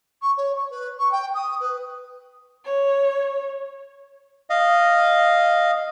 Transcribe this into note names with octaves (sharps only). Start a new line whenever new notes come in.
C#6
C#5
C#6
B4
C#6
G5
D#6
B4
C#5
D#5 F5